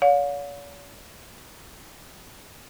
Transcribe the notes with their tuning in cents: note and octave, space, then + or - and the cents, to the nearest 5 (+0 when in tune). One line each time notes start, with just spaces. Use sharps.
C#5 +45 F5 +35